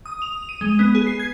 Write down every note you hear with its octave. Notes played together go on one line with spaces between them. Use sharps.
D#6
F7
D#7
G#3
B3
G#4
C7
G#6